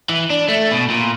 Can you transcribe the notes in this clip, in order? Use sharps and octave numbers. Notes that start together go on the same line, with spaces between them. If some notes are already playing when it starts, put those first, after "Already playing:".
E3
D4
A3
B2
A#2